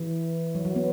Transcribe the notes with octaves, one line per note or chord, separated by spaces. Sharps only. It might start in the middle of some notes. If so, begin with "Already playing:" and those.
Already playing: E3
F#3
F#3
B3